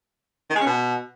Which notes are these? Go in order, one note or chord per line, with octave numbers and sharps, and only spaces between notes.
D#3
G#3
C#4
B2